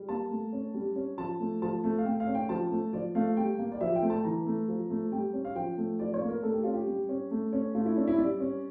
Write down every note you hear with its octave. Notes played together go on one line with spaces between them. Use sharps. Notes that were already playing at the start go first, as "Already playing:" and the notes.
Already playing: G3
A#3 A5
A3
C#4
G3
C#4
F3 A5
A3
F3 A5
A3
F5
A3 G5
F5
C#4
G5
F3 A5
A3
F3 D5
A3 F5
G3 G5
A#3
D5
F3 E5
G5
A3
A5
E3 A#5
A3
F3
A3
G3 G5
C#4
F5
F3 G5
A3
F3 D5
C#5
A#3
A#4
A3 A4
G4
C#4 F4
G4
G3
C#4
A3
C#4
A3 F4
E4
C#4 D4
E4
G3 D5
C#4